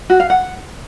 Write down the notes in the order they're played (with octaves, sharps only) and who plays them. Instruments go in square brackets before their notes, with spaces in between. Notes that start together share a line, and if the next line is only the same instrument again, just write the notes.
[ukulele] F#4
F5
F#5